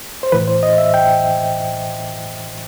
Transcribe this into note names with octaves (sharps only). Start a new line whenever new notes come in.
C5
A2 E3 B4
C5
D#5
E5
G5